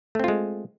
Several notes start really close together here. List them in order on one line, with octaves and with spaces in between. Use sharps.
A3 C4 F4 G#3